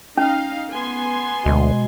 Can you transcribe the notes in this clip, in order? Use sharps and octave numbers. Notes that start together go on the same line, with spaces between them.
C#4 D#4 F5
B3 G#5 C6
D2 B2 G#3